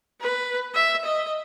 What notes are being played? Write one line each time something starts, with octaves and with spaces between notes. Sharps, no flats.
B4
E5
D#5